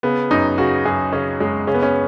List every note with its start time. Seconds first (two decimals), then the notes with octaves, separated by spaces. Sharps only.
0.03 C#3 B3
0.31 F#2 D#4
0.58 C#3 F#4
0.85 F#2 G#4
1.13 C#3 C#4
1.40 F#2 G#3
1.67 C#3 C#4
1.74 B3
1.82 C#4